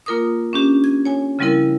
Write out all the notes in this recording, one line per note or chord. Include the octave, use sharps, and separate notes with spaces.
A#3 F4 A#4 D6 D#6
C#4 D4 G4
G#6
C#5 G#5
C#3 F3 G3 C4 E4 A#4